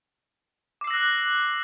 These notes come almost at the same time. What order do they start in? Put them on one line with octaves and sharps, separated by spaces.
D6 C7 E6 A#6 F#6